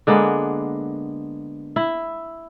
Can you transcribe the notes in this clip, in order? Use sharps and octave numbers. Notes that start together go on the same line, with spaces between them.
D3 G#3 A#3 B3
E4